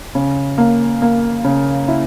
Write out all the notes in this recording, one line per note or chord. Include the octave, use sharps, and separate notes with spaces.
C#3
A#3
A#3
C#3
E4